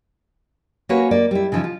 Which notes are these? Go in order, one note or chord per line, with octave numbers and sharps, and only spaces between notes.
A#3 C#4 F#4 B4 C#5
A#3 D5
G3 E4
C#3 E3 F3 D#4
F4